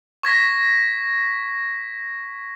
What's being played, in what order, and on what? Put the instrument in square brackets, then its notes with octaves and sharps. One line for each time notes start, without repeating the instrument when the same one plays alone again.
[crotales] C#6 G#6 A#6 B6